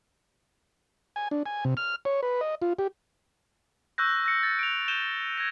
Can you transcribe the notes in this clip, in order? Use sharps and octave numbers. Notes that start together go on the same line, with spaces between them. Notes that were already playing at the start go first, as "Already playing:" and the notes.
G#5
D4
G#5
C3
F6
C#5
B4
D#5
F4
G4
C#6 E6 F#6 G6 A#6
E6 A#6 C#7
A6
D7 F7
G6 D#7 E7 G7
G#6 A#6